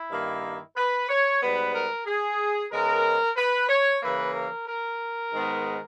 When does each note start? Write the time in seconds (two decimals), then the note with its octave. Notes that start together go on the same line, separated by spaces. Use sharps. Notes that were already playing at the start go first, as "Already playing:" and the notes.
Already playing: E4
0.11 G2 D#3 A#3
0.76 B4
1.09 C#5
1.41 G#2 G3 B3 B4
1.74 A#4
2.06 G#4
2.71 C#3 G#3 B3 A#4
3.37 B4
3.69 C#5
4.02 C#3 E3 A#3 B4
4.34 A#4
4.67 A#4
5.32 G#2 D#3 G#3 B3